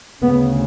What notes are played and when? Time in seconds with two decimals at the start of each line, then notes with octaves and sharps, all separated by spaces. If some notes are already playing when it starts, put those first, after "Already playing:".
0.22 D2 C#3 B3